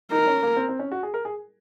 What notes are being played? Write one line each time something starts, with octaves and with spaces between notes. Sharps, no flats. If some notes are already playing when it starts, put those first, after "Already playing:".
D#4 A#4
C#4
A#3
C4
C4
C#4
F#4
G#4
A#4
G#4